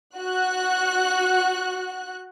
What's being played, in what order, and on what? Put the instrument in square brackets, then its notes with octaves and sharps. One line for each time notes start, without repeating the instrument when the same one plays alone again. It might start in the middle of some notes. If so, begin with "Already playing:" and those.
[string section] F#4 F#6